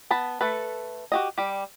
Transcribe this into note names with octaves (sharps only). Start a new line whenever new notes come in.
B3 A5 B5
A3 A4 B4
F#4 G4 D#5
G3 G4